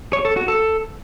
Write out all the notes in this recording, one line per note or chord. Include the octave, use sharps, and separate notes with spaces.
C#5
A4
F#4
A4